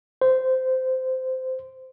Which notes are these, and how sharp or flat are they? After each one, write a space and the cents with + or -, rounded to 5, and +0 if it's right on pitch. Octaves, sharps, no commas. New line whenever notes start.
C5 -15